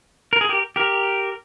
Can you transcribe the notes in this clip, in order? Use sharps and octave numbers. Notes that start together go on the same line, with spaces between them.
A#4
G#4
G4 A#4
G4 A#4